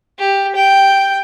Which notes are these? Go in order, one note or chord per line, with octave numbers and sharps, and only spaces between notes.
G4
G5